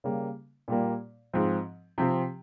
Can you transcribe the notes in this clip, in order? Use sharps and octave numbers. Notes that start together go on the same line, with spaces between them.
C#3 G3 A#3
A#2 G3 A#3
G#2 F3 C4
C3 F3 C4 G4